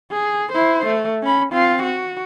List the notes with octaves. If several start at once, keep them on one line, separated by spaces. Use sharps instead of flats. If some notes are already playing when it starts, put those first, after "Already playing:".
G#4
E4 C5
A3
C#4 B5
C4 F4
F#4